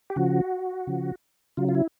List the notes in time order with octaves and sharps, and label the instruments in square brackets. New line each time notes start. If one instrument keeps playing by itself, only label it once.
[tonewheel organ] G4
C#3 F3 F#4
C#3 F3
C#3 F#3 F4
F4
E4